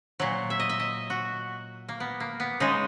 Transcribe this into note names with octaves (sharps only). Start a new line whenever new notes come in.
A#2 F#3
E5
D#5
E5
D#5
F#4
A#3
B3
A#3
B3
C#3 G#3 D#4